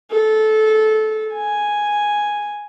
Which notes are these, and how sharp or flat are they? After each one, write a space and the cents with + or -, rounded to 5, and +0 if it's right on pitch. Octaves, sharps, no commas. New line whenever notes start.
A4 -20
G#5 +0